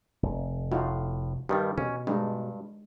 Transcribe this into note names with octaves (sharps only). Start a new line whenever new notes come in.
F1
A2 D#4 F4 F#4
G2 D#3 G3 G4
B2 C#4
G2 G#3 D4 D#4